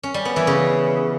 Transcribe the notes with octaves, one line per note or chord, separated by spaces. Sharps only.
C#4
G3
B3
E3
C#3